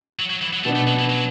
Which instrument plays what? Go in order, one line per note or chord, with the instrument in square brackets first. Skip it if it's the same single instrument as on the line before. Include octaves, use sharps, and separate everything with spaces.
[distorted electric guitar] F#3
F#3
E3
F#3
[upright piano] B2 B3 D4 [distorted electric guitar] A3
[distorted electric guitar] A3
F#3
E3
F#3